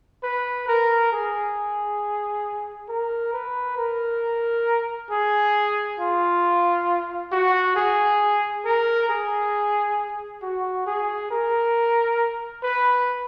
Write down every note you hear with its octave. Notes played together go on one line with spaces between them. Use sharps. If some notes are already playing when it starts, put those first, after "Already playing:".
B4
A#4
G#4
A#4
B4
A#4
G#4
F4
F#4
G#4
A#4
G#4
F#4
G#4
A#4
B4